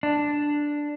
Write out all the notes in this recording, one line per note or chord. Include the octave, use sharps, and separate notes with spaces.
D4